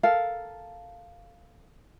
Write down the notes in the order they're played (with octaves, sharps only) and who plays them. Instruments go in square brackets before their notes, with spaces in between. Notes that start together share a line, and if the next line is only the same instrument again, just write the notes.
[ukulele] A4 A#4 F5